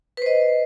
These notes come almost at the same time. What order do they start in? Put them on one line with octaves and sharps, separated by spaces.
B4 C5 D#5